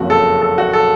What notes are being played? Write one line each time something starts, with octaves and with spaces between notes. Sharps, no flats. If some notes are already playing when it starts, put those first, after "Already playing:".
Already playing: F#1 F2 C#3 F#4
A4
A4
F#4
A4